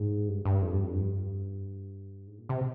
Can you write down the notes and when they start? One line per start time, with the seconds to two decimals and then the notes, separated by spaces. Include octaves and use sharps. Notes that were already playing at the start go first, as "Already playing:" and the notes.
Already playing: G#2
0.28 G2
0.45 G2
0.62 F2
0.73 G2
0.83 F2
0.95 G2
2.27 G#2
2.38 A#2
2.49 C3